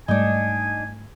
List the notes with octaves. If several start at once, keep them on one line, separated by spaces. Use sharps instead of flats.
G#2 G3 A3 D4 D#4 G#5